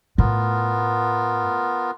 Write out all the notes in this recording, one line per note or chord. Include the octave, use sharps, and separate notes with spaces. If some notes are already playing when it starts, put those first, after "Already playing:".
A2 B3 F4 A#4